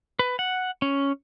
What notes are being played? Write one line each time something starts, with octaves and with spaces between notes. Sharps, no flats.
B4
F#5
C#4